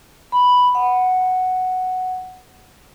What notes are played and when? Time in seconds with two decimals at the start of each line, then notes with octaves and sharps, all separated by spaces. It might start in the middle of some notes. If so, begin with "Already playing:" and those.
0.32 B5
0.75 F#5